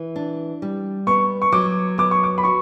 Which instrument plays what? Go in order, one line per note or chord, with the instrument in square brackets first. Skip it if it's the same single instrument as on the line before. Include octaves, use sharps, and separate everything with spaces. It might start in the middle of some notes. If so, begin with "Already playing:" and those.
Already playing: [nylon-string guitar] E3
D4
G3
[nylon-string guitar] B3 [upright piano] C#6
[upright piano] C#6
[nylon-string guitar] F#3 [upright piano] D6
[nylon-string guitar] B3 [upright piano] D6
[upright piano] C#6
D6
B5
[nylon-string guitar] F#4 [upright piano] C#6